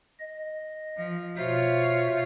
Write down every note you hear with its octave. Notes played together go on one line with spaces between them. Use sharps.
D#5
F3
B2 F4 C5 C#5 E5